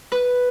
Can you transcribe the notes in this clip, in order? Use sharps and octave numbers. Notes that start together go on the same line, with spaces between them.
B4